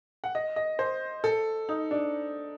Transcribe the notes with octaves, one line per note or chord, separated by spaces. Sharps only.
F#5
D#5
D#5
C5
A4
D#4
D4